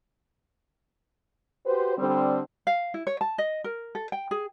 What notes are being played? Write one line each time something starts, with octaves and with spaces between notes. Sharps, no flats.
F#4 G4 B4 C5
D3 G3 C4
F5
E4
C#5
A5
D#5
A#4
A4
G5
G#4